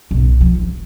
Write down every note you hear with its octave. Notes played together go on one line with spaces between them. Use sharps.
B1 C#3
F3
E3